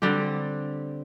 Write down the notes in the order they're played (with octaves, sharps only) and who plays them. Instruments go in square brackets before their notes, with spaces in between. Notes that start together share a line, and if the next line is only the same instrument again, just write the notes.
[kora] D3 G3 C4 G4